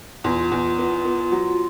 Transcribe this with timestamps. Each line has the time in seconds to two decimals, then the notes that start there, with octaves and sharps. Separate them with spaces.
0.24 E2 F4
0.52 E2
0.78 B3
1.05 B3
1.32 F#3